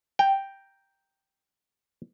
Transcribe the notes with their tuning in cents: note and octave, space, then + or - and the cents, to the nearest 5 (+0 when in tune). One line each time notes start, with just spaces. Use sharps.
G5 +0 A#5 +0